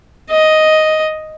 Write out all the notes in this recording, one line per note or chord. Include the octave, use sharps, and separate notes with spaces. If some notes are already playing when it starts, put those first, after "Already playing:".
D#5